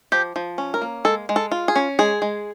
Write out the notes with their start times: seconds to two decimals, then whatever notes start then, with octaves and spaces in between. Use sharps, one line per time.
0.12 F3 G4
0.36 F3
0.58 C#4
0.74 A#4
0.82 A#3
1.05 G#3 A4
1.29 G#3
1.36 A4
1.52 F4
1.68 G#4
1.76 C#4
1.99 G#3 G#4
2.22 G#3